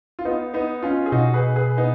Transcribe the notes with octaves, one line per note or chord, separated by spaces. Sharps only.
F4
B3 D#4
B3 D#4
C#4 F4
G#4
B2 D#4 F#4
G#4 B4
G#4 B4
B3 D#4